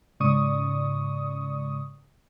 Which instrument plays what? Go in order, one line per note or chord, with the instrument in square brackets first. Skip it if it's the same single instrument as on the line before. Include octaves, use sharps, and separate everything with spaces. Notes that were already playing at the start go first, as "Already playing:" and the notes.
[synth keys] G#2 C#3 D5 C#6 D#6